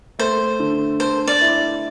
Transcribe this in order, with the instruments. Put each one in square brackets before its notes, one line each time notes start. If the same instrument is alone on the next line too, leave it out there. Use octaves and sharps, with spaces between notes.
[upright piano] A3 [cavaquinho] C5
[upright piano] D3
[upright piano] A4 [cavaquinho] C5
[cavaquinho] D5
[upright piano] E4